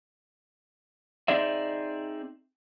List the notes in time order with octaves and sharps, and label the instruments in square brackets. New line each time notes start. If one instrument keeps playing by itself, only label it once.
[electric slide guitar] C4 D#4 G#4 D5 E5